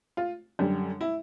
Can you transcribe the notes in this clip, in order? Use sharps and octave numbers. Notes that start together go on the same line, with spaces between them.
F4
F#2 D3 G3
E4